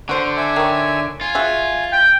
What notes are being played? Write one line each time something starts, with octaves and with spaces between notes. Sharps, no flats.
D3 F#4 C5
E5 G#5
D#3 C#5
F4 G#5
F#4 G#4 E5
G5